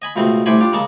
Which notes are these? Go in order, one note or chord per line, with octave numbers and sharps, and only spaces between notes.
D#5 G#5 B5
C#2 B2 A3 C4
C2 A2 C5 D5 G#5 B5
D4 F4 G4
C#3 G#3 A#3 A5